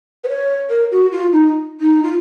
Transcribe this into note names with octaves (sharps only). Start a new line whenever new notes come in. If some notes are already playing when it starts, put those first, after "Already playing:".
B4
C#5
A#4
F#4
F4
D#4
D#4
F4